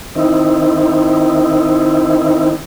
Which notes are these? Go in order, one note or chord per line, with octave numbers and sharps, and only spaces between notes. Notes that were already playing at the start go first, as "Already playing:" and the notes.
D#3 C4 D#4 E4